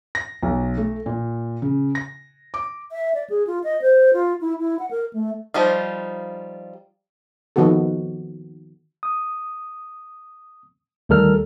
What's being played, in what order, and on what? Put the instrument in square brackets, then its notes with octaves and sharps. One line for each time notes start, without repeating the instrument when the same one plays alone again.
[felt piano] A#6
B1
A3
A#2
C#3
A#6
D6
[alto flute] E5
D5
G#4
F4
D#5
C5
F4
E4
E4
F#5
A#4
A3
[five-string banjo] F3 G3 D#4 F4
[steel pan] D#3 F3 B3 F#4 A4
[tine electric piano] D#6
D2 D#3 G3 A4 A#4 F6